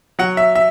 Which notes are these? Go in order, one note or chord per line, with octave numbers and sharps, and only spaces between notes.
F#3 F#5
E5
E5